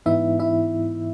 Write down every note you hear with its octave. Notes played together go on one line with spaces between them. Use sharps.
G#2 E3 B3 D#4 E4 E5
E4 E5